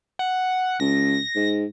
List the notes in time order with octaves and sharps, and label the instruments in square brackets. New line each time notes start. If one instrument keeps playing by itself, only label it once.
[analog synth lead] F#5
[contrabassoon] C#2 [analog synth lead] A#6
[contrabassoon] G#2